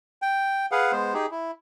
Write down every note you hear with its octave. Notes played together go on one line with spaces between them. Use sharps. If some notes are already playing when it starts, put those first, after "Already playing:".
G5
G#4 B4 F5 F#5
G#3 B3 C5
D#4 G4 G#4
E4